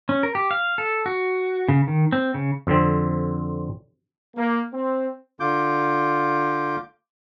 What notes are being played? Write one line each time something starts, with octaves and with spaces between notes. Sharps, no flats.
C#4
A#4
G4
F5
A4
F#4
C#3
D#3
C4
C#3
F2 D3 C4
A#3
C4
D3 F4 D6 G6